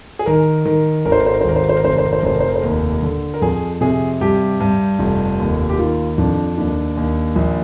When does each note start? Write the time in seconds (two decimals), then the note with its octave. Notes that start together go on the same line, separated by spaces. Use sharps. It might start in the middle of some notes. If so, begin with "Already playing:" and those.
0.19 G#4
0.26 D#3 A#4
0.66 D#3
1.05 G#1 A#4
1.12 C5
1.20 A#4
1.26 C5
1.34 A#4
1.41 C5
1.45 G#1 A#4
1.56 C5
1.62 A#4
1.69 C5
1.76 A#4
1.84 F1 C5
1.90 A#4
1.98 C5
2.05 A#4
2.13 C5
2.20 A#4
2.23 F1 C5
2.34 A#4
2.40 C5
2.48 A#4
2.56 C5
2.62 D#2 A#4
3.03 D3
3.34 A#4
3.42 F2 G#4
3.81 C3 G#4
4.21 G2 G4
4.60 G2
4.99 F1
5.40 D#2
5.70 G4
5.78 D#3 F4
6.18 F2 D4
6.57 D#2 D4
6.97 D#2
7.36 A#1